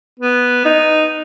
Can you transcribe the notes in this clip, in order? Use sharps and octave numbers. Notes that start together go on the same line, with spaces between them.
B3
D#4